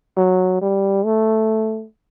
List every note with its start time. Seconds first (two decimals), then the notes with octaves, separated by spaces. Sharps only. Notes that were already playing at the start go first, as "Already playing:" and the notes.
0.17 F#3
0.62 G3
1.05 A3